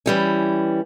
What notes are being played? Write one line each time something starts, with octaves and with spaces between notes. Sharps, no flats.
E3 G3 C#4